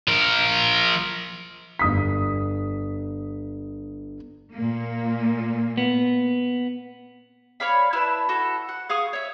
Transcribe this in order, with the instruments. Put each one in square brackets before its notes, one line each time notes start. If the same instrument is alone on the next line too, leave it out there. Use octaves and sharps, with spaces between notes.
[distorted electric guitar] F3 A#4
[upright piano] G1 D#6 B6
[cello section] A#2 A#3
[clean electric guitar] B3
[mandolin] C#5 D5 F5 B5
E4 B4 A5
F#4 A4
F#5
G#4 F5 C#6 D#6
C#5 E5